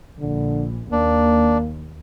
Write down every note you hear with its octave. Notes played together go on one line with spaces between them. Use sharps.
A#1 D3
D#2 A#3 D4